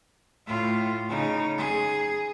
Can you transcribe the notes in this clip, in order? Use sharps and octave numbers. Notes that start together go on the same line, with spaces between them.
A2 F4
C#3 D#4
G#4